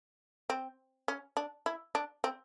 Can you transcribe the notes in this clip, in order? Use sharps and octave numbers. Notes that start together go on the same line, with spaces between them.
C4
C#4
D4
E4
D4
C4